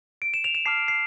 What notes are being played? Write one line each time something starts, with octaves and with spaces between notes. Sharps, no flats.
D7
E7
F7
E7
A5 D6 F6 C7
D7
C7